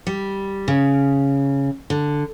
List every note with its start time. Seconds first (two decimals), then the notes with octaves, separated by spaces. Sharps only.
0.07 G3
0.68 C#3
1.90 D3